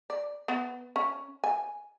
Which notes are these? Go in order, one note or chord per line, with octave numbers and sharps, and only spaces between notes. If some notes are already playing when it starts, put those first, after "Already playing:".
D5
B3
C#4
G#5